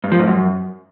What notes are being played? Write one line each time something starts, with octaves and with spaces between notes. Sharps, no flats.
G2
F3
G#2
F#2